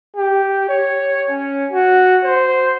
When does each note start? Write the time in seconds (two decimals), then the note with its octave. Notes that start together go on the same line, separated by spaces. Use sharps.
0.16 G4
0.69 C#5
1.30 C#4
1.72 F#4
2.24 C5